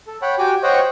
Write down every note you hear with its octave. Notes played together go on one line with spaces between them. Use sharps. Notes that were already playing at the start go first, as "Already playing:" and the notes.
A4
C#5 F#5 G5 B5
F#4 G4 G5 G#5 D6
C5 C#5 D#5 F#5 G5 C#6